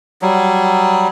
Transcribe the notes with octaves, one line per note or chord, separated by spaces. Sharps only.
F#3 G3